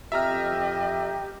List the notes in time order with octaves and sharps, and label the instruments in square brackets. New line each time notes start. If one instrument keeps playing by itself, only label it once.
[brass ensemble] F2 [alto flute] G4 [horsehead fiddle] D#5 [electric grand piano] E5 A#5 F6